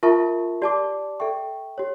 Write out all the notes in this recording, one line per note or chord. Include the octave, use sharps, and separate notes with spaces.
F4 A#4 E5 A5 C#6
G4 D5 A5 D6
A4 E5 G5 C#6
G4 C#5